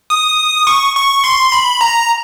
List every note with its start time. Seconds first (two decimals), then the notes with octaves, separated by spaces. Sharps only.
0.10 D#6
0.67 C#6
0.95 C#6
1.24 C6
1.52 B5
1.81 A#5